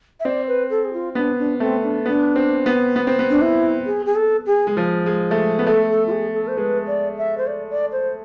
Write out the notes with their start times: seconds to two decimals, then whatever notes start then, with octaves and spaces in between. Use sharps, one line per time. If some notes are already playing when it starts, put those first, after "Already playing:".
0.20 E5
0.25 C4 D5
0.47 B4
0.70 A4
0.85 G#4
0.93 F4
1.15 B3 D4
1.39 D4
1.60 A3 C4
1.83 D4
2.06 B3 D4
2.36 C4
2.66 B3
2.96 B3
3.07 C4
3.19 B3
3.29 D4
3.41 E4
3.86 G#4
4.06 G#4
4.16 A4
4.46 G#4
4.67 G#3
4.77 F3
5.06 G#3
5.31 A3
5.36 G#3
5.59 B3
5.66 A3 A4
5.90 A4
6.07 F4
6.11 G#4
6.34 A4
6.48 C5
6.57 G#3 B4
6.87 D5
7.18 E5
7.38 C5
7.47 D5
7.70 D5
7.92 C5